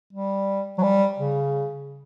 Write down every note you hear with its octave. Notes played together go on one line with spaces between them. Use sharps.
G3
F#3
G3
C#3